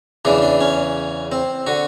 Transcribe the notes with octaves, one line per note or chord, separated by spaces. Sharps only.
E2 C#3 E3 D4
D4
C#4
C4
D3 F#4